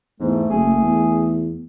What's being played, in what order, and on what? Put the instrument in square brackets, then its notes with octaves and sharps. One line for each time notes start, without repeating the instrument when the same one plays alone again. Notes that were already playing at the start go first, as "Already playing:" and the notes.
[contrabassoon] E2 [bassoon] G#2 [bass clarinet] A3
[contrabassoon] F#1 [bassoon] G#4
[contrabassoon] E2